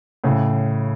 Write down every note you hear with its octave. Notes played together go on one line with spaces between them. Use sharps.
A2 C#3